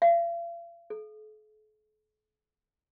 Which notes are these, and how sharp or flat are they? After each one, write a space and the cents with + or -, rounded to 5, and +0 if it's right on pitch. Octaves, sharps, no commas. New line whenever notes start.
F5 -45
A4 -45